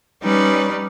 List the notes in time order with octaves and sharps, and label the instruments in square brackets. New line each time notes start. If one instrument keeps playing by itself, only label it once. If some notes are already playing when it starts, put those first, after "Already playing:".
[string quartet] G3 C#4 D#4 B4 D5